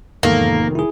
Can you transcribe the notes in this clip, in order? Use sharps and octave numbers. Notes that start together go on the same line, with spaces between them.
F1 E2 G#2 D#3 A#3 A4
E4 G#4